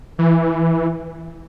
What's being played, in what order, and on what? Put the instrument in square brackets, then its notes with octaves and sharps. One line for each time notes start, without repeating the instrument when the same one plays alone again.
[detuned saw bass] E3